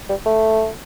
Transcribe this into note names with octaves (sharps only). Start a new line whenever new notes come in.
G3
A3